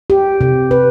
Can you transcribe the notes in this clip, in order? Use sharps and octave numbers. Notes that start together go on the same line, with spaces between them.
G4
C3
B4